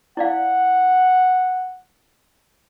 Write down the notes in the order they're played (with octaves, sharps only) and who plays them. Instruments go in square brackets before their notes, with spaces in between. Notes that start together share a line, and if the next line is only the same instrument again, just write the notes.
[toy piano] E4 D5 F5 [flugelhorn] F#5